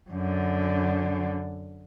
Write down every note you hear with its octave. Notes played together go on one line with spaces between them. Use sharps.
F#2 D3